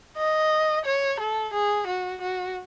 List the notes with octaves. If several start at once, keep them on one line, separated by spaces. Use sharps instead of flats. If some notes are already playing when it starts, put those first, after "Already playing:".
D#5
C#5
A4
G#4
F#4
F#4